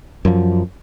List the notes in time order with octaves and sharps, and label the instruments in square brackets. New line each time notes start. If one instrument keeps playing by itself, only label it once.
[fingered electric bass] F#2 F3